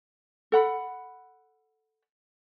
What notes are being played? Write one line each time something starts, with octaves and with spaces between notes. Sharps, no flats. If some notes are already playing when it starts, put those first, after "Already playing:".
A4 F#5 B5